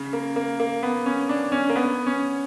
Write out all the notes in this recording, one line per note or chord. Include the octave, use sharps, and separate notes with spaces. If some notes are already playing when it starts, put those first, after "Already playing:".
Already playing: C#3
A#3
A#3
A#3
B3
C#4
D4
C#4
A#3
B3
C#4